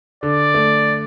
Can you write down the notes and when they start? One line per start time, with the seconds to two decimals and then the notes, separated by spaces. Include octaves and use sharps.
0.23 D3 D5
0.54 A3